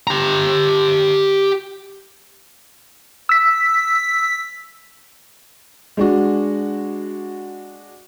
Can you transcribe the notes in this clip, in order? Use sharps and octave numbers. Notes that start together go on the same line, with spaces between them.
G4 A#5
E6 B6
G#3 D4 F#4